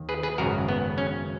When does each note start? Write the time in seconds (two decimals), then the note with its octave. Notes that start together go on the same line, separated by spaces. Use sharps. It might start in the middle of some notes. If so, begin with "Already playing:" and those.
Already playing: D#2 D#3
0.09 G#4 B4
0.23 G#4 B4
0.38 G#1 F#2 C#3 F#4 A#4
0.68 B3
0.98 C#4